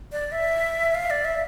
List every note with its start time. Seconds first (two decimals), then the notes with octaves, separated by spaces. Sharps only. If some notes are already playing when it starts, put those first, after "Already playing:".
0.12 D5
0.32 E5
0.95 F5
1.10 D5
1.25 E5